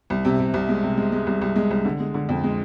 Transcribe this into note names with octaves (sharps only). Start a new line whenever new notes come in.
C2
C3
C3
C2
G#3
C3
G#3
G#3
C2
C2
G#3
C2
D3
G#3
D3
F2
G#3